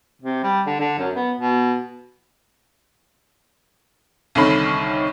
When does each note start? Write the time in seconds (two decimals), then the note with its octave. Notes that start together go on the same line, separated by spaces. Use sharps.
0.22 C3
0.43 G3
0.66 D3
0.80 D3
0.98 F#2
1.16 B3
1.40 B2
4.35 C2 D3 D#3 C#4 B5